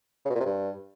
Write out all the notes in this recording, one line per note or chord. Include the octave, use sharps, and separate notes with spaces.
C#3
B2
A#2
C3
G2